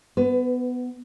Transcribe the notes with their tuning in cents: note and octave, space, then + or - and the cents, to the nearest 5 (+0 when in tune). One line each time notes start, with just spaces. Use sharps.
B3 +10 B4 +30